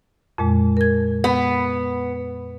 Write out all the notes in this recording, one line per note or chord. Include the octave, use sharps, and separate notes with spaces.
F2 A#2 G#3
A#4 G#6
B3